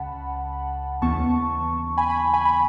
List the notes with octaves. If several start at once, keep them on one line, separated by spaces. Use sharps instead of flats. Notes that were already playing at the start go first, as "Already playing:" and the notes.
Already playing: C#2 C#3 F#5 A5 B5
D#2 C#3 E3 B3 A5 C#6
G#5 B5
G#5 B5
G#5 B5
G#5 B5